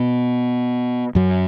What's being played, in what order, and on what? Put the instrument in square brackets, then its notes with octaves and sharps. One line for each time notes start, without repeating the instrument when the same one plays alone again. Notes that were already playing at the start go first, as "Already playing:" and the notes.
Already playing: [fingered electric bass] B2 B3
F#2 F#3